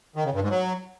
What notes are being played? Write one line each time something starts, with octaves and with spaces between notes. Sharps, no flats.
D#3
C#3
G2
G#2
F#3